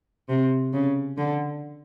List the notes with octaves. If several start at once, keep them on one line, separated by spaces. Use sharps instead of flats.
C3
C#3
D3